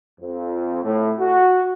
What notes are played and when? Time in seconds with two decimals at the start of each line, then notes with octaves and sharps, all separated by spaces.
0.21 F2
0.84 A2
1.20 F#4